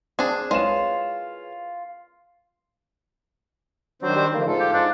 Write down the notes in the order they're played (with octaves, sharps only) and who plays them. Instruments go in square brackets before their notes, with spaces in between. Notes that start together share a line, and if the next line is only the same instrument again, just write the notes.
[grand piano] C4 [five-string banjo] D4 G#4
[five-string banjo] G#3 [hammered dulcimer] F4 [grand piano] B4 C#5 E7
[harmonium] D#3 D4 C5 [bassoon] F#3 [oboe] C4
[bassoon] G3
[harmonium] D3 F3 A3 [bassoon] A#3
[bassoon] G#2 [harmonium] F4 A4
[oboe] G4
[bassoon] G#2 [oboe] D4